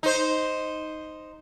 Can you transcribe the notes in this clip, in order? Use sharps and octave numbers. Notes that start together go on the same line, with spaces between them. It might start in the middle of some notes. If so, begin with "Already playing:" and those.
D#4 C5